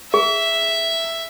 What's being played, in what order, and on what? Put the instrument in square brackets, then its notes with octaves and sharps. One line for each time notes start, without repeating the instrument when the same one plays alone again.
[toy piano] G#4 [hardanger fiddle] E5